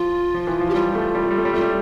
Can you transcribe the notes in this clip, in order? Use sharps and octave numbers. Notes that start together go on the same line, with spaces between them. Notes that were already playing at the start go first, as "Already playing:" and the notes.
Already playing: F3 F4
F3
E3
F3
G4
G3 F4
A3
G3
A3
G3
A3
G3
A3 F4
G3